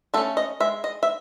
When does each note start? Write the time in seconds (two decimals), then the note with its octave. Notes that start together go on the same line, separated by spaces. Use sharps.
0.14 A3 A4
0.17 C#4
0.37 D#5
0.60 G#3 E5
0.84 D#5
1.03 E5